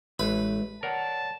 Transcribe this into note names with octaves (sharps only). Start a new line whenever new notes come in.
A1 G#3 B4 E5
A#4 C#5 D5 F#5 A5